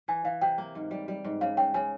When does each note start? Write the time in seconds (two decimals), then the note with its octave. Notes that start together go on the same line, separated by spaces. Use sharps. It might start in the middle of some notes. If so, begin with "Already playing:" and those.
0.08 E3 G#5
0.25 E3 F5
0.41 C3 G5
0.58 A#3
0.75 G#2
0.91 G3
1.08 G3
1.24 G#2
1.41 C#3 F5
1.57 C#3 G5
1.74 C#3 G#5